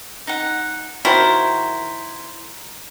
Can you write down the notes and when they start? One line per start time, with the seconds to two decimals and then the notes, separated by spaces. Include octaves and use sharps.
0.27 D#4 F#5
1.05 D#3 E4 F#4 A#4 C5